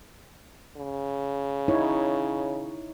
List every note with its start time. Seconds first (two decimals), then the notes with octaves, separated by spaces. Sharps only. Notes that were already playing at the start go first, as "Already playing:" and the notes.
0.77 C#3
1.68 D#4 E4 C#5